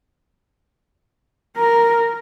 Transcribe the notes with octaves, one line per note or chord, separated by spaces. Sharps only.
A#4 A#5